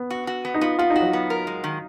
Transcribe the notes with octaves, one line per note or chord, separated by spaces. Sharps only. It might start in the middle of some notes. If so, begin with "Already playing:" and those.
Already playing: B3
F#4
F#4
B3
D#4
B3 F4
B3 F4
D#4
F#4
F#3
B3
A#4
G#3
D#3